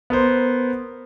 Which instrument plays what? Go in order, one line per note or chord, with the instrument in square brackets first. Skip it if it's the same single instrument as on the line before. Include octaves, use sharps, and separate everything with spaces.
[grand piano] B3 A#4 C5